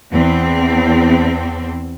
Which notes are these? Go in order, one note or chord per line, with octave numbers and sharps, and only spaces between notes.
E2 C4